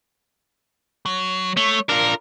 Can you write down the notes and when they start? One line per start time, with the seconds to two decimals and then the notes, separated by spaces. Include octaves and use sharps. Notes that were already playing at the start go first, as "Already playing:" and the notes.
1.06 F#3
1.57 A3 C#5
1.89 D4 F4 A#4